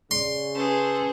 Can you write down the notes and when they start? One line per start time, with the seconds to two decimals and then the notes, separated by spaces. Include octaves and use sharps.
0.11 C#3 D5 C6
0.55 C#4 G#4 A4 B4 C5